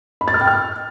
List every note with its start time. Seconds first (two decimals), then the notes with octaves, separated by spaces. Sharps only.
0.21 B5
0.28 A6
0.34 F6
0.41 G5
0.47 F6